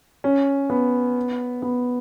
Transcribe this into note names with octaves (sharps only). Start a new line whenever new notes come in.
C#4
B3
B3